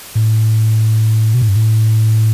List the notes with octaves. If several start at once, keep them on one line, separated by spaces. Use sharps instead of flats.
A2
B2
A2
G2
A2